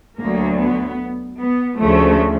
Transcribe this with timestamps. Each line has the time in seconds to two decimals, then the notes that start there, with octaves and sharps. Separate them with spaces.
0.19 D2 D3 F#3 A#3
0.59 B3
1.39 B3
1.79 D2 C#3 F3 A3